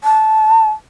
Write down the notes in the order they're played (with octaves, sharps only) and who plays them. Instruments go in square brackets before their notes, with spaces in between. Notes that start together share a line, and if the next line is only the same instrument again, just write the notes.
[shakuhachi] A5